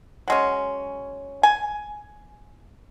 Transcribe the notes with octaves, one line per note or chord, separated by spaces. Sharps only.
F#3 G#3 C#4
G#5